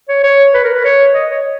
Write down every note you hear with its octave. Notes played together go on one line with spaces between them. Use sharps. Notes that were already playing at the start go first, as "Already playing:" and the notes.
C#5
C#5
B4
A#4
B4
C#5
D#5
C#5